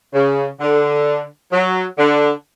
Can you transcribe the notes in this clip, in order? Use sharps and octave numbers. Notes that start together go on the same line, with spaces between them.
C#3
D3
F#3
D3